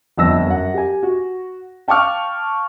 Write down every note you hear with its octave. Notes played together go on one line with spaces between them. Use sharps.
G1 F2 E6 A#6
F#2 F#5
G4 G#5
F#4
F5 G5 A5 C#6 D6 F6